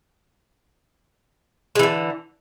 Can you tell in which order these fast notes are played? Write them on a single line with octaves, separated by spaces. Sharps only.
G#3 E3 D3